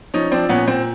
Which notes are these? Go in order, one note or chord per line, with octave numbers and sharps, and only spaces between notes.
F3 C#4 D#4
F3 C4 D4
A#2 B3 C#4
A#2 C4